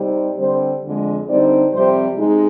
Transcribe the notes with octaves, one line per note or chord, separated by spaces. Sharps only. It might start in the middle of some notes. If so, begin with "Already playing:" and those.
Already playing: C3 G3 C4 D#4
D3 G3 C4 C5
F2 D3 G#3
D3 G3 C4 D#4 D5
F2 C3 G3 C5
C3 G#3 D#4